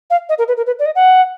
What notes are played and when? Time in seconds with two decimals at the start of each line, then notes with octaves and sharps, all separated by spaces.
0.10 F5
0.29 D#5
0.38 A#4
0.48 B4
0.57 A#4
0.67 B4
0.79 D5
0.86 D#5
0.95 F#5